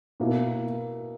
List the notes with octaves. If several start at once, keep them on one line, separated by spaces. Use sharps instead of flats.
B2 A#3 E4